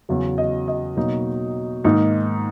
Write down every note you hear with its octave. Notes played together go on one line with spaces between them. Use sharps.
E2 C#3 F#3
D#5
D#5
B2 F#3 A#3 D#4
G#2 D#3 A#3 D#4